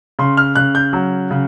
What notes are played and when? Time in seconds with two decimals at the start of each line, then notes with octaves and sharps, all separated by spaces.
0.19 C#3 C6
0.37 F6
0.55 C#3 F#6
0.75 G6
0.93 F#3
1.31 C#3